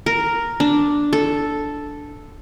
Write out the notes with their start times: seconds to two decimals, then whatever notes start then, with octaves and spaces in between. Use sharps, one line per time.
0.06 A#4
0.60 D4
1.13 A4